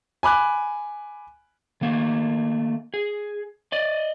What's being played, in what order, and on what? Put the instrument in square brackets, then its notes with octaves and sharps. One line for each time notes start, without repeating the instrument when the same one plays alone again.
[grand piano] G#5 B5 D6 F#6
[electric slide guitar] D#3 A3 A#3
G#4
D5 D#5